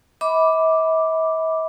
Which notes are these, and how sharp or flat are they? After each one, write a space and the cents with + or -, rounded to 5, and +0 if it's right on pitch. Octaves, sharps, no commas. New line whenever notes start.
E5 -45 B5 +0 D6 +0